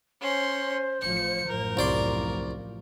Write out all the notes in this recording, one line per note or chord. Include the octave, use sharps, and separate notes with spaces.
C#4 C5 C6
A1 F3 C#7
A1 F#2 F3 A#4
C2 D5 C6